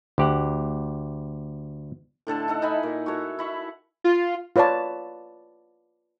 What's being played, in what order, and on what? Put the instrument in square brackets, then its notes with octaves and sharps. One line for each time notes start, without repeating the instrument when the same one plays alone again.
[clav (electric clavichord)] D2 G4 F#5
[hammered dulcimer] A2 D3 A4 A5
D#4 A4 F#5
D#4 E4 G#5 B5
A#2
F#4 A4 C#5 E5
E4 B5 C#6
[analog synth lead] F4
[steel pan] F4 B4 C#5 D5 A5